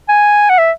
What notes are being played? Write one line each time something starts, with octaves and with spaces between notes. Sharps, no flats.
G#5
F#5
E5